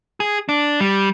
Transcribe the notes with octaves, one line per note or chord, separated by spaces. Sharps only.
G#4
D4
G3